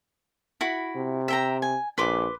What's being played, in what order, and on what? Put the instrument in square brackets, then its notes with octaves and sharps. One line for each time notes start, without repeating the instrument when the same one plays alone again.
[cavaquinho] E4 F#4 B5
[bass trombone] C3
[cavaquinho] E5 G5 A#5
G#5
[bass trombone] A#1 [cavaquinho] B4 C6 D6